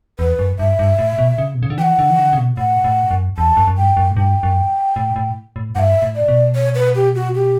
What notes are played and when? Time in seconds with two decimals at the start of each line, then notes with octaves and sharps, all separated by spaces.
0.19 E2 B4
0.39 F#2
0.59 G2 E5
0.79 G2
0.99 A2
1.18 B2
1.38 C#3
1.55 B2
1.63 C#3
1.70 D3
1.78 E3 G5
1.82 F#5
1.99 D3
2.10 E3
2.18 D3
2.33 C#3
2.37 B2
2.57 A2 F#5
2.84 A2
3.11 F#2
3.37 E2 A5
3.57 F#2
3.68 F#2
3.77 G2 G5
3.97 F#2
4.11 A2
4.16 G2 G5
4.43 F#2
4.96 A2
5.16 A2
5.56 A2
5.75 G2 E5 F#5
6.02 A2
6.15 D5
6.28 B2
6.55 C#5
6.75 B4
6.95 G4
7.15 F#4
7.35 G4